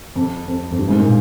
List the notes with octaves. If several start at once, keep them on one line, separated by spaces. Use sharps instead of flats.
F2
F2
F2
G2
G#2
A#2